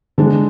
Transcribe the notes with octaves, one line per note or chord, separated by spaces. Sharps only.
D3 G#3 D4